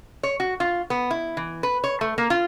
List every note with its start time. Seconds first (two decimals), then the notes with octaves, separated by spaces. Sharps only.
0.23 C#5
0.40 F#4
0.60 F4
0.90 B3
1.11 E4
1.37 E3
1.63 B4
1.84 C#5
2.01 A3
2.18 A#3
2.30 F4